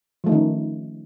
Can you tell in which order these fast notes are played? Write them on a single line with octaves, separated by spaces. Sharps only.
F3 A3 D#4 D#3 C#4